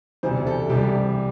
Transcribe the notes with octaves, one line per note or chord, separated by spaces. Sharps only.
E1 D2 C3 E3 C5
A4
C2 C3 E3 G3 G4